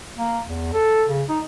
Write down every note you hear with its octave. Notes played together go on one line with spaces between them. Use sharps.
A#3
E2
A4
C#3
D#4